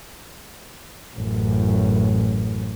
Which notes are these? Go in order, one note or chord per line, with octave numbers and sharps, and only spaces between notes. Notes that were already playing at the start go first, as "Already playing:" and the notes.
A1 F#2